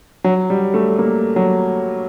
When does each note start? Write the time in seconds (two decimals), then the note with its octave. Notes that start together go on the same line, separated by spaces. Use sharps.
0.24 F#3
0.50 G3
0.74 A3
0.98 A#3
1.36 F#3